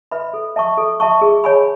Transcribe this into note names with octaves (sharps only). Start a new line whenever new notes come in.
B4 E5 B5
A4
E5 A5 C#6
A4
E5 A5 C#6
G#4
C#5 G#5 B5